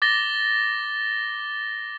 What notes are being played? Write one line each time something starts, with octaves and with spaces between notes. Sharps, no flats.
D6 A6 A#6 G7